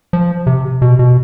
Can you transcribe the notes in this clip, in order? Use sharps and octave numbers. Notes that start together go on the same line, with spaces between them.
F3
C3
B2
B2